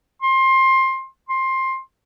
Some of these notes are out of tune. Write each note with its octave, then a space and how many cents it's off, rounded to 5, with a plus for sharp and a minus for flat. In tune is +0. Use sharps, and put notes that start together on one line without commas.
C6 +20
C6 +15